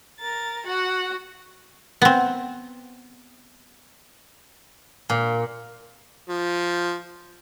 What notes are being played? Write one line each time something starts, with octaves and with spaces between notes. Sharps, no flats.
A#4 A6
F#4 F#5
B3 C4
A#2
F3